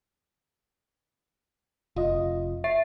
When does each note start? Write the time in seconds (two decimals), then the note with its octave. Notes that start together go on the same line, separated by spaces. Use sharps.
1.96 F1 F4 D#5
2.64 E5 A6 C7